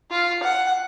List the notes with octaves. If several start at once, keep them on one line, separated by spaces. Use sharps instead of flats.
F4
F#5